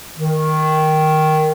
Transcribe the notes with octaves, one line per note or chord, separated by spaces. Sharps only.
D#3